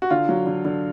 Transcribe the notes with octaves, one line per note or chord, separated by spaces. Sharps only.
F#4
D3 F4
F#3
D3
D3